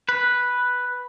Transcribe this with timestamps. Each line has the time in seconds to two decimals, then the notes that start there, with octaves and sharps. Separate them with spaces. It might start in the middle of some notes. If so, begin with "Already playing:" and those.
0.09 B4